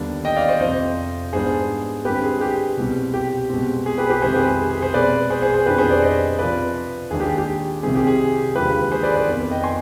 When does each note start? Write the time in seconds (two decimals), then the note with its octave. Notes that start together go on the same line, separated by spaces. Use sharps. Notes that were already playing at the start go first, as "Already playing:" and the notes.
Already playing: D#2 D3 G3 B3 D4
0.25 D#5 G5
0.36 D5 F5
0.48 C5 D#5
0.61 F2 C3 F3 C4 C5 D#5
1.33 G#2 G3 B3 D4 G#4 C5
2.05 G2 D3 G#3 C4 G4 B4
2.24 G#4
2.41 G4
2.77 C2 B2 G3 C4
3.14 G4
3.50 B2 G#3 C4
3.86 G#4
3.98 G4 B4
4.10 G4 B4
4.22 F2 C3 D#3 G#3 G#4 C5
4.34 G4 B4
4.46 G#4
4.70 G#4
4.82 G#4 C5
4.94 B2 G#3 C4 B4 D5
5.30 G#4 C5
5.42 G#4 C5
5.54 G#4 C5
5.66 F2 D#3 B3 D4 G4 B4
5.78 G#4 C5
5.91 B4 D5
6.02 C5 D#5
6.39 C3 F3 C4 B4 D5
7.10 D#2 D#3 G#3 D4 G#4
7.20 G4
7.38 G4
7.83 C2 C3 D#3 G3 C4 G#4
7.95 G4
8.07 G#4
8.55 D#2 D3 F3 G#3 G4 B4
8.92 G#4 C5
9.03 B4 D5
9.16 B4 D5
9.27 F2 D#3 B3
9.51 D#5 G5
9.63 G#5 C6